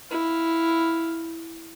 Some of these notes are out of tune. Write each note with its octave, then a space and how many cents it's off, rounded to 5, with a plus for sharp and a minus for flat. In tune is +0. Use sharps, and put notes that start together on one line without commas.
E4 +0 F5 +0